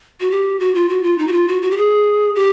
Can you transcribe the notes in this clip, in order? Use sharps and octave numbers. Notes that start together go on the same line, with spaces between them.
F#4
G4
F#4
F4
F#4
F4
D#4
F#4
F4
F#4
F#4
G4
G#4
G4